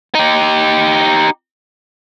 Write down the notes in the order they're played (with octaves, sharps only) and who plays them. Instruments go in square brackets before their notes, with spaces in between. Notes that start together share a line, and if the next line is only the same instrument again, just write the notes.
[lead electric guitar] D#4 G4